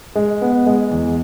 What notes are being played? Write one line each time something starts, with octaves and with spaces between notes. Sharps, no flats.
G#3
B3
G#3
E2